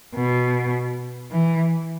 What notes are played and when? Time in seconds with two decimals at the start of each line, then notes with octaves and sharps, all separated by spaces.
0.15 B2
1.32 E3